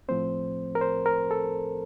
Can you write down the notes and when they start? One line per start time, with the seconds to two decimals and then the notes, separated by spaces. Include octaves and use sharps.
0.09 A2 F3 A3 C4 C5
0.75 A#4
0.81 C5
1.06 A#4
1.31 A4